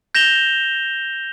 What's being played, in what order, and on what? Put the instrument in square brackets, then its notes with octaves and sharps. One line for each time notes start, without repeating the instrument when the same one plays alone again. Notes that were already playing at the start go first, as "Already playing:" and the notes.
[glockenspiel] G6 A#6 E7 F7 G7